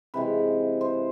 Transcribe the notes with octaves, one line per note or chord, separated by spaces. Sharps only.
C3 E3 G#3 B4
C5